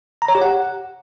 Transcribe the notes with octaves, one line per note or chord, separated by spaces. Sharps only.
A#5
C#5
G4
F#5